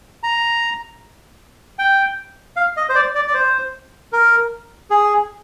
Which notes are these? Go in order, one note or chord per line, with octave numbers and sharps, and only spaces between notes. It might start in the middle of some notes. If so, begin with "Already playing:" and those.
A#5
G5
F5
D#5
C5
D5
D5
D5
C5
A#4
G#4